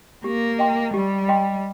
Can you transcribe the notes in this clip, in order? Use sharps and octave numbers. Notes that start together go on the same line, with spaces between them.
A#3 G4
D#5 G5 C6
G3 G4
D#5 G5 C6